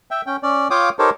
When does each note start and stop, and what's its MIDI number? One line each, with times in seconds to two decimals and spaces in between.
0.11 0.22 76
0.11 0.22 79
0.26 0.37 61
0.26 0.37 79
0.43 0.68 61
0.43 0.68 74
0.70 0.89 65
0.70 0.89 73
0.70 0.89 77
0.70 0.89 79
0.70 0.89 86
0.70 0.89 87
0.99 1.10 63
0.99 1.10 67
0.99 1.10 69
0.99 1.10 70
0.99 1.10 72
0.99 1.10 73